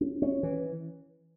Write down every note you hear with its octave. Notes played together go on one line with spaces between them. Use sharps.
C#4
C#4
E3